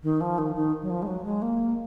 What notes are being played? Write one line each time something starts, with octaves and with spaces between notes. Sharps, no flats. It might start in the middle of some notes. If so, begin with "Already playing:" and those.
D#3
F3
D#3
D#3
F#3
F3
G#3
F#3
G#3
A#3